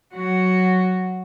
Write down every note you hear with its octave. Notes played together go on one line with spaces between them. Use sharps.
F#3 F#4